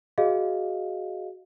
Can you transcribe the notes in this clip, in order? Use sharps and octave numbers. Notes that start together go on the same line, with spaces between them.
F#4 G#4 D#5 F5